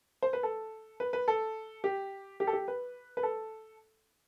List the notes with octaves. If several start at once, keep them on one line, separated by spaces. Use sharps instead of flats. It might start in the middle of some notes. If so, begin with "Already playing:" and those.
C5
B4
A4
B4
B4
A4
G4
G4
A4
G4
B4
B4
A4